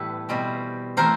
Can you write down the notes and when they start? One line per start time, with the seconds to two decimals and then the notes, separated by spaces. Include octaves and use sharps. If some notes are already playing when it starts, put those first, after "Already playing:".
Already playing: A2 E3 G3 B3 A4 B4
0.29 B2 G3 C4
0.97 E3 A3 C4 A#4 C5